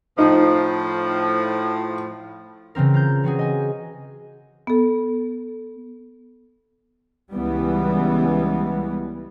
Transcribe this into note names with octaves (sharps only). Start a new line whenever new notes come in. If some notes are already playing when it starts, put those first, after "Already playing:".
A2 F3 D#4
C#3 E3 C4 A#4
F4 A#5 G6
E3 C4 F#4 G#4
D#5 G#5
B3 A4
C#2 E3 G3 B3